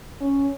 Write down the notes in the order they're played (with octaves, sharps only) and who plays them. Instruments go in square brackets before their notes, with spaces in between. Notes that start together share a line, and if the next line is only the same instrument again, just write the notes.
[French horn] C#4